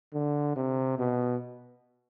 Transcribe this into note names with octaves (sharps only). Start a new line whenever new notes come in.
D3
C3
B2